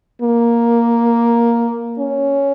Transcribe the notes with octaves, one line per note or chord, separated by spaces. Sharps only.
A#3
C#4